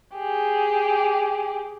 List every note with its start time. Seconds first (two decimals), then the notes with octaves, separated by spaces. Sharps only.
0.17 G4 G#4